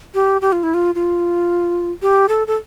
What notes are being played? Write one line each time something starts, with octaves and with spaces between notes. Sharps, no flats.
G4
G4
F4
E4
F4
F4
G4
A4
A4